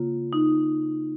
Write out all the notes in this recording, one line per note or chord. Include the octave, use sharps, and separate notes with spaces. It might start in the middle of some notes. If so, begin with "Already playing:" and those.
Already playing: C#3 A#3 F4
D#4